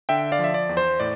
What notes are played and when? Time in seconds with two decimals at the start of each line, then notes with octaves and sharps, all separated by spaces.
0.09 D3 E5 G5
0.32 D5 F5
0.39 F3
0.44 E5
0.54 D5
0.69 E2
0.77 C5
1.00 A2 D5